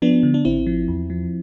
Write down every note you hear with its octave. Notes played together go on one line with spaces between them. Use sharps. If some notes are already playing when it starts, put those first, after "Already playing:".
F3 B3 D4
D3
D4
A1 C4 E4
F3
E2
F3